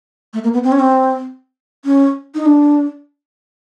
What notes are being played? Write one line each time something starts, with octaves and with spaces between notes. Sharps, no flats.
A3
A#3
B3
C4
C#4
C4
C#4
D#4
D4